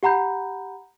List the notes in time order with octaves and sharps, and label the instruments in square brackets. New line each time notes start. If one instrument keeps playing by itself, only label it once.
[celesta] G4 F#5 A#5 B5 G6